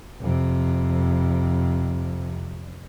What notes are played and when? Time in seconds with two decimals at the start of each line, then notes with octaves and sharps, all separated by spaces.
0.21 F2 C3